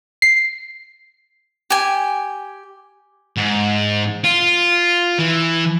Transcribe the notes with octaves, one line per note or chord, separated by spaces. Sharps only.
C7
G4 G#5
G#2
F4
E3